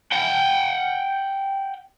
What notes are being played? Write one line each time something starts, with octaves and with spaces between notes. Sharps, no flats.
F#5 G5